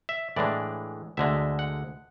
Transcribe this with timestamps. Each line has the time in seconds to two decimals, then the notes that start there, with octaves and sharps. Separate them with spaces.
0.09 E5
0.36 A2 E3 G#3 D4 D5
1.17 D2 D3 G#3 E5
1.59 F#5